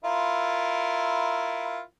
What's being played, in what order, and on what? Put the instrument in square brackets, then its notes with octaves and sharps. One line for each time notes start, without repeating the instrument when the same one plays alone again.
[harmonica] E4 F4 A#4